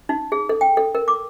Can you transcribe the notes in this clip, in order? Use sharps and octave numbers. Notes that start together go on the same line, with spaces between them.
D#4
G#4
A4
G5
A4
A#4
D6